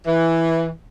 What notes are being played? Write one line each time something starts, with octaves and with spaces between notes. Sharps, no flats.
E3